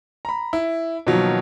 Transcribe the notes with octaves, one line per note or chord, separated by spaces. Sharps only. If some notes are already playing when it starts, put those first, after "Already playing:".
A#5 B5
E4
B2 D#3 F3 F#3 A#3